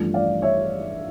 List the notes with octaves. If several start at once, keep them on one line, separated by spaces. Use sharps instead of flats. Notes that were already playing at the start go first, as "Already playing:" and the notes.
Already playing: A1 G2 F3 A3
D5 F5
C#5 E5